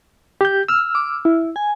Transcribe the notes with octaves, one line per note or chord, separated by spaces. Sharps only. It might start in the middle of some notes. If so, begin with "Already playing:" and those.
G4 G6
E6 F6
D6
E4
G#5